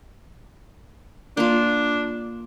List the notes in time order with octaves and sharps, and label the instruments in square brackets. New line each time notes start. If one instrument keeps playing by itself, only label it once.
[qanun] A#3 F4 [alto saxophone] D4